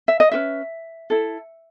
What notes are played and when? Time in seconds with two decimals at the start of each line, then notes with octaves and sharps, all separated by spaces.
0.08 E5
0.20 D#5
0.32 C#4 F#4 B4 E5
1.10 E4 A4